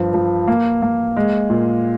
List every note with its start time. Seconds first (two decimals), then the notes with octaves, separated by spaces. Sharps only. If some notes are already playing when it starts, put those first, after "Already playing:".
Already playing: G2 F3
0.14 F3
0.48 A#3
0.82 A#3
1.17 G#3
1.50 A#2